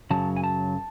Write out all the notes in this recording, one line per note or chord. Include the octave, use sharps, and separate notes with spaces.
F#2 C#3 F#3 A5
G#5
A5